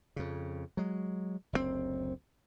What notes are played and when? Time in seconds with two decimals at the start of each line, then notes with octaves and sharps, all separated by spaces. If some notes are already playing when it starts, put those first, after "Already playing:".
0.16 F2 C#3
0.77 F#3 G#3
1.53 F#1 D2 A2 C4